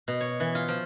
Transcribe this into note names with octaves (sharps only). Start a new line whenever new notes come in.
B2
C#5
E3
F4
F3